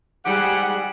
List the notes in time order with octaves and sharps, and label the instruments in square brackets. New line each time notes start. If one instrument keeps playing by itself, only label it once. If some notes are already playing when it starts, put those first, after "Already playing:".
[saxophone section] G#2 G4 F#5 [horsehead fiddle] G3 G#4